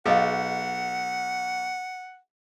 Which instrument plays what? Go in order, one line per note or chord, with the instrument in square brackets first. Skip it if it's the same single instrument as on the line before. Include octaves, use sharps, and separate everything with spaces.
[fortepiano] B1 [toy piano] G#4 D#5 F5 [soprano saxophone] F#5